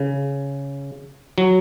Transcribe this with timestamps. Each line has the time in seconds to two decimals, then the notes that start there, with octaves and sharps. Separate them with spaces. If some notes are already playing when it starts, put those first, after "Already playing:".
Already playing: C#3
1.38 F#3